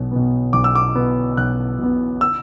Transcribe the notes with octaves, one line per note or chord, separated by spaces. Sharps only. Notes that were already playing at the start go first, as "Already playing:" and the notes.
Already playing: B1 B2 B3
B2 B3
B1 D6
E6
D6
B2 B3
B1 F#6
B2 B3
E6